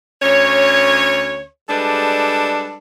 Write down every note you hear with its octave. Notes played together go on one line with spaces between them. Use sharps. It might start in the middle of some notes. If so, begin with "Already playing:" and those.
D2 C#4 C#5
G3 G#3 D4 A4 B4